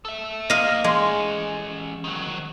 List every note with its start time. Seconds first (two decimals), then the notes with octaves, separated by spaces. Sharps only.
0.05 A4 E5
0.50 A#3 G4 D#5 F5
0.84 E3 G#3 C#4
2.04 D#3 F#3